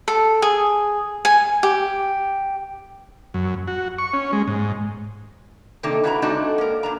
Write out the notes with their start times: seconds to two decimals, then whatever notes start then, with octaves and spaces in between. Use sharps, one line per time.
0.08 A4
0.42 G#4
1.25 G#5
1.63 G4
3.34 F#2
3.68 F#4
3.98 C#6
4.13 C#4
4.32 G#3
4.48 G#2
5.83 C3 D#3 A#3 D4 D#4 A4
6.04 C#3 E4 F#4 B4 A5 A#5
6.22 G#3 C4 D4 D#4 F#4 A4
6.58 A#3 A#4
6.83 A#2 D4 A#5